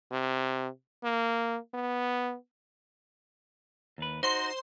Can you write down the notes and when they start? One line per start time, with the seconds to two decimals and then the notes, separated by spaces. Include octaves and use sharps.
0.12 C3
1.04 A#3
1.74 B3
3.98 D#2 B4
4.23 D#4 F#4 C5 C6